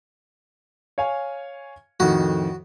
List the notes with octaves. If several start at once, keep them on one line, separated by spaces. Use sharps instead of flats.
C#5 F5 G#5
F2 A2 D#3 F#4